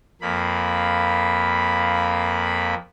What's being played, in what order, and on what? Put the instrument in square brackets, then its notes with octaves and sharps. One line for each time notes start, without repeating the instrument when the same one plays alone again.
[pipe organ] F2 A#3 B5